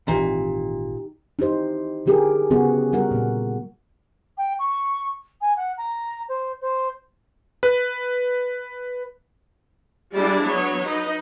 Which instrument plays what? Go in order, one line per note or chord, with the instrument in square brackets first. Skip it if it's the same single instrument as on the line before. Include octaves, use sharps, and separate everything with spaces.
[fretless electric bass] G#1 E3 [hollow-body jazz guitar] A#2 [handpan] D#4 G4
[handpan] D#4 E4 G4 C5
D3 F#3 G4 G#4 A#4
C#3 F#3 B3 F#4 G#4
G3 F#4 A#4 F#5
A#2 A#3
[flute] G5
C#6
G#5
F#5
A#5
C5
C5
[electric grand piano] B4
[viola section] G3 G#3 A#3 D4 E4 D5
F#3 B3 C#5
D#4 B4